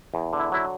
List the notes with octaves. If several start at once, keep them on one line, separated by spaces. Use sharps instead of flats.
E2
D3
E4
F#3 E4